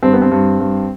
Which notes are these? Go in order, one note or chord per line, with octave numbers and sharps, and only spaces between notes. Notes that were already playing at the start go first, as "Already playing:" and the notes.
G2 C4
B3
C4
G2
G2